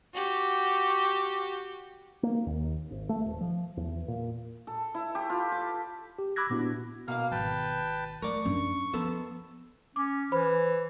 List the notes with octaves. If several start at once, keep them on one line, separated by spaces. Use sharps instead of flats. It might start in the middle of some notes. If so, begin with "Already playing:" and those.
F#4 G4
A#3
D#2
G#1
A3
D#1
F3
E2
A#2
A4
E4
G4
F4
A5
G4
B5 D6 E6 F#6 G#6 A#6
A#2 B3 D4 E4 F#4
B2 A#3 F5 F6
G#1 B4 G5 A5
A3 A#4 D5 C#6
F#2 D4
F3 B3 A4 C5
C#4 D6
E3 C5 B5